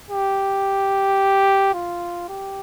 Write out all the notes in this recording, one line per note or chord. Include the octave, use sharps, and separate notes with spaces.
G4
F4
G4